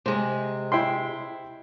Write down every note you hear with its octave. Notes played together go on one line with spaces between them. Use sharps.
C3 G#3
E4 G5 C6